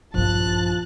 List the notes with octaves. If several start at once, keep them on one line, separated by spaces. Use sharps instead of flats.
A#1 G2 F3 E4 A5 F#6